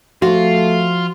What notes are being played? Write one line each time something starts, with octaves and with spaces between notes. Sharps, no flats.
F3 A3 F4 F#4